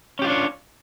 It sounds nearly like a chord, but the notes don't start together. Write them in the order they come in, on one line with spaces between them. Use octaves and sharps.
C#4 G4 F4 D4 C#5